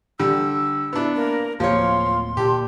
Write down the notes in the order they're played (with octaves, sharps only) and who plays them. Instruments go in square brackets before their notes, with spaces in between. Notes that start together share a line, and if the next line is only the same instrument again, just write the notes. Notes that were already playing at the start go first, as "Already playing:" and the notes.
[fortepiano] D3 G3 [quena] E6
[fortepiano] B3 D4 [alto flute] E4
[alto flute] A#3 [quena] A#4
[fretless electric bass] D1 A#3 [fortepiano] F3 C#5 [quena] F5 [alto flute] C6
[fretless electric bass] A#2 [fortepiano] G4 [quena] A5